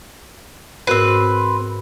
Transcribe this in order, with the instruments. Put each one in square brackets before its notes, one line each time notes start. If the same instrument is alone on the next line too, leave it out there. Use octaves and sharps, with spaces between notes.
[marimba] G#2 F#4 A#4 [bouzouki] C4 B4